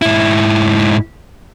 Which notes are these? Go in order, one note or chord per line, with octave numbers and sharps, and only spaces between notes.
G#2 E4